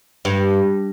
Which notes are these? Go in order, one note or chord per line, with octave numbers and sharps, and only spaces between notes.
G2